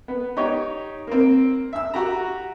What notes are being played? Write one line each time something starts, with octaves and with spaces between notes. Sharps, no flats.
B3
D#4 G4 C#5
A#3 C4
E5 E6
F#4 G4 A#5